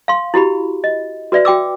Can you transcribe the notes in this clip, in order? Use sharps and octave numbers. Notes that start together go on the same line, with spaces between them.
F5 C6
E4 F#4 G4 B5
D#5
F#4 B4 D5 E5
F#4 G5 D6 E6